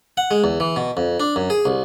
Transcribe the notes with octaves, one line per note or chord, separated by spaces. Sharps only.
F#5
G#3
E2
E3
B2
F2
D4
F#2
G#4
C2